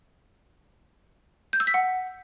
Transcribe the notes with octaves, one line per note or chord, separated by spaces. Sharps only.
G6
E6
B6
F#5